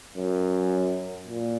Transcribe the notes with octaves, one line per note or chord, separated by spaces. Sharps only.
F#2
A#2